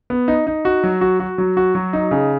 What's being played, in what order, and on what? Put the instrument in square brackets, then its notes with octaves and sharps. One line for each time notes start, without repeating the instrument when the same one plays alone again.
[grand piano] B3
D#4
D#4
F#4
F#3
F#4
F#4
F#3
F#4
F#3
D#4
C#3